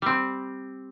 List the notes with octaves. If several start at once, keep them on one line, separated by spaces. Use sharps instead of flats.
G3 C4